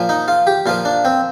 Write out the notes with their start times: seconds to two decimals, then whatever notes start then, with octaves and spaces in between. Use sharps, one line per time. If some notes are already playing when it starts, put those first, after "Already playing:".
Already playing: A#2 F3
0.09 D#4
0.28 F4
0.47 G4
0.66 A#2 F3 F4
0.85 D4
1.05 C4